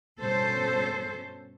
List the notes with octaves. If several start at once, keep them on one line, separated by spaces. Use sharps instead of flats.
G2 B2 C#4 A4 C5